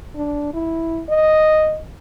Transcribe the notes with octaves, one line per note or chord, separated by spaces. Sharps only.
D4
E4
D#5